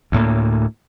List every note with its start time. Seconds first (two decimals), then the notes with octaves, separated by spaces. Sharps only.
0.12 D2 A2 A#3